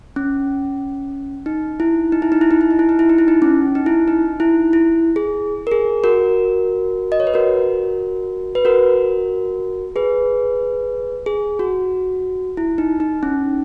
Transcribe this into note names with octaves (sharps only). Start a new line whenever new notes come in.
C#4
D#4
E4
D#4
E4
D#4
E4
D#4
E4
D#4
E4
D#4
E4
D#4
E4
D#4
C#4
D#4
E4
D#4
E4
E4
G#4
A#4
G#4
F#4 A#4
D#5
C#5
B4
F#4 A#4
B4
F#4 A#4
G#4 B4
G#4
F#4
E4
D#4
D#4
C#4